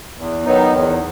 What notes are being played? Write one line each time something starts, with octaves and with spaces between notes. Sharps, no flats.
E2
D#3 F#3 B3 D#4
E2